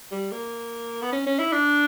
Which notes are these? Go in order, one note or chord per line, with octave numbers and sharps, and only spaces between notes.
G3
A#3
B3
C#4
C#4
E4
D4